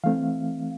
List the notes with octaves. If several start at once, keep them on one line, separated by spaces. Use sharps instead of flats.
E3 A3 C4 F5